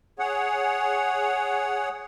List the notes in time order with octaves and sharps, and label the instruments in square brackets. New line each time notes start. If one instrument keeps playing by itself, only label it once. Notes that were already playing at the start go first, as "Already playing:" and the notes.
[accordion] G#4 C#5 F#5